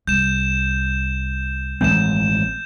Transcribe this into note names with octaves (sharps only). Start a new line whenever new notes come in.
C2 G6 E7
A1 G#3 C4 G6 E7